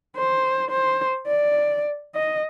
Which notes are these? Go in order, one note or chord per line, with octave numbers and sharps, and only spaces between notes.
C5
C5
D5
D#5